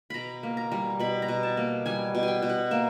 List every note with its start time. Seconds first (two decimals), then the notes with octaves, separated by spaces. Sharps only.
0.10 B2 A#5 B5
0.43 A#3
0.57 A#5
0.72 G3
1.00 B2 B5
1.22 A#5
1.28 B2
1.43 A5
1.57 A#3
1.86 G3 G#5
2.15 B2
2.23 G#5
2.28 G5
2.42 B2
2.49 F#5
2.71 A#3 E5